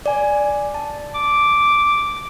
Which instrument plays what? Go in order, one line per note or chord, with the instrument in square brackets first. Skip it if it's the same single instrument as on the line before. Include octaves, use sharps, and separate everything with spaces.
[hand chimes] D5 G#5
A5
[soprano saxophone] D6